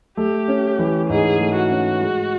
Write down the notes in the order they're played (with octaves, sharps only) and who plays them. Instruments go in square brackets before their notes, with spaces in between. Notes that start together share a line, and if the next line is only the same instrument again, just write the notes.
[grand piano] A3 [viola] G4
[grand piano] C#4
E3
[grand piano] G#2 [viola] G#4
[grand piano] A3
[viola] F#4
[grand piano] C#4
G#3